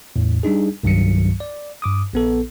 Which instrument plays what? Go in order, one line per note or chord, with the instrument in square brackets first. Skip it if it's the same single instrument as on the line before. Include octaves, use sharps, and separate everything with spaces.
[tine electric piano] E2 A2
G3 D4 D#4 G#4
C2 G2 D#3 F#3 C#7
D5
G2 D6 D#6
A#1 B3 A4